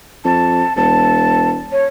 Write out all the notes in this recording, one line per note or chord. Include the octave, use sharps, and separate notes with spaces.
F2 A5
E1 A5
C#5